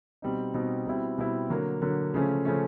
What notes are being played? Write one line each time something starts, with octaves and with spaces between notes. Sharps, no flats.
B2 G3 C4 D#4
B2 G3 C4 D#4
B2 G3 C4 E4
B2 G3 C4 E4
D3 F#3 A#3
D3 F#3 A#3
C#3 F3 A3 C#4
C#3 F3 A3 C#4